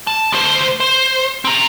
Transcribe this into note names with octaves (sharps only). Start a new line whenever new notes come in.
A5
D2 C5
C5
C4 A#5